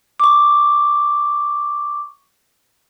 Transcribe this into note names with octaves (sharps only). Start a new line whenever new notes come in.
C#6 D6